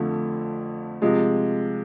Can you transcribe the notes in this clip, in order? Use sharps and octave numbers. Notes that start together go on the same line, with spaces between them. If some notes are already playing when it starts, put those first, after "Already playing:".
Already playing: F2 D3 F3 A3
C3 F3 G#3